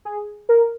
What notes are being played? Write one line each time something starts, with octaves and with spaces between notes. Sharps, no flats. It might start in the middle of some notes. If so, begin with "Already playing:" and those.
G#4
A#4